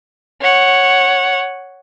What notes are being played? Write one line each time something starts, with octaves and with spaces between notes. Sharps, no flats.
C#5 F#5